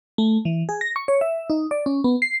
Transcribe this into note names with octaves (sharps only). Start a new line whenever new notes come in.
A3
E3
G#4
A#6
C#6
C#5
E5
D#4
D5
C#4
B3
C7